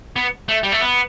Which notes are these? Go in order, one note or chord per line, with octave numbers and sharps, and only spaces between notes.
B3
A3
G3
A3
B3